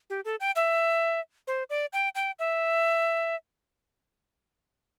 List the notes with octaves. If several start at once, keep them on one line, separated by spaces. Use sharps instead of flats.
G4
A4
G5
E5
C5
D5
G5
G5
E5